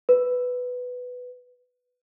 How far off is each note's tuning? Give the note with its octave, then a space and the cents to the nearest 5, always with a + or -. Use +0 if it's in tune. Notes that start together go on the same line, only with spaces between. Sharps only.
B4 +5